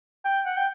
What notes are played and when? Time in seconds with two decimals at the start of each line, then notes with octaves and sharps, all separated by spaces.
0.25 G5
0.46 F#5
0.57 G5